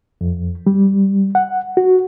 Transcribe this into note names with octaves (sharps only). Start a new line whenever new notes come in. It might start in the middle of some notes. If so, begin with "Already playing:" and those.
F2
G3
F#5
F#4